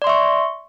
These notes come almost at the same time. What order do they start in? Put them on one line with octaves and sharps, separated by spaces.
D5 C6 E5 C#6